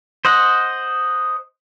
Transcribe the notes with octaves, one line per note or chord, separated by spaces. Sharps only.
C5 D#5 F#5